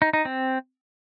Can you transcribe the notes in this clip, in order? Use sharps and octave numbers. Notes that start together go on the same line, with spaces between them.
D#4
D#4
C4